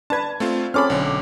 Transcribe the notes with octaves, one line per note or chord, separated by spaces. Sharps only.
D4 B4 A5 G#6
A3 C4 F4
C4 C#4 A4 B5 D6 F6
B1 D3